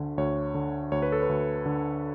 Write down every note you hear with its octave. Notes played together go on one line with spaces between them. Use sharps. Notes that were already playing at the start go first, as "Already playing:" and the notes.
Already playing: D2 D3
D2 C#5
D3
D2 C#5
B4
A4
B4
D2
D3